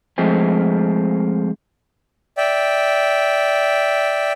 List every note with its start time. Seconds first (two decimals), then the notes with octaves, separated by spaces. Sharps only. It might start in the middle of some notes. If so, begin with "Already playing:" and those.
0.18 F2 F3 G#3 A3 C4
2.37 D5 E5 G5